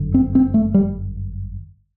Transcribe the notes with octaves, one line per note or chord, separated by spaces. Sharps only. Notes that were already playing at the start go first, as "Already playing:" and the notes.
Already playing: G1 F#2 D3
C4
C4
A3
G3